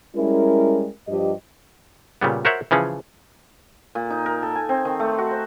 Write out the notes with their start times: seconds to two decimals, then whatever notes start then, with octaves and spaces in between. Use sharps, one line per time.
0.16 G3 G#3 C#4 E4 A#4
1.08 G2 F3 G4 D#5
2.21 A#2 C#3 G3 B3
2.45 F#4 A#4 C5 C#5 E5 F#5
2.71 C#3 E3 F3 C#4 G#4
3.95 A#2
4.10 D#4
4.26 A#4
4.43 A4
4.55 G#5
4.69 C4
4.85 D#3
5.00 A3
5.18 F#4
5.31 C5